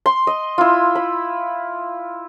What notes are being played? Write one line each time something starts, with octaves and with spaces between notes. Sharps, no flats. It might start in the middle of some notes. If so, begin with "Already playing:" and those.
C6
D#5
E4 F4
B5